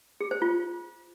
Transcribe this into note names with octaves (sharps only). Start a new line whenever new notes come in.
G#4
C5
F4